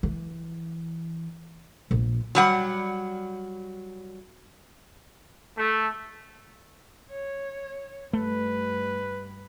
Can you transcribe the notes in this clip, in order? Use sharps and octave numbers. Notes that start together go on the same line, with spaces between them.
E3
A#1
F#3 G3 F#5
A3
C#5
G2 A3 B4